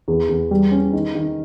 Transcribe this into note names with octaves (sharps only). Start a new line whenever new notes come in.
E2
E2
G3
C#4
D#3
D#3